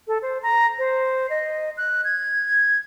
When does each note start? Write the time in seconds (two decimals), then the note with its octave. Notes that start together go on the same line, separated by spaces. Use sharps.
0.08 A4
0.22 C5
0.43 A#5
0.79 C5
1.30 D#5
1.78 F#6
2.04 G#6